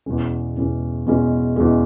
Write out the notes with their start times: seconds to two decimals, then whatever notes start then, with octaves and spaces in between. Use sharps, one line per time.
0.06 E2 B2 G#3 C#4
0.57 E2 B2 G#3 C#4
1.06 E2 B2 G#3 C#4
1.56 E2 B2 G#3 C#4